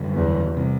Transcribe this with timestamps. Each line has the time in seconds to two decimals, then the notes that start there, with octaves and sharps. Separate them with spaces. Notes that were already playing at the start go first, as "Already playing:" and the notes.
Already playing: F#2 D3 G3
0.15 E2
0.57 C3 G3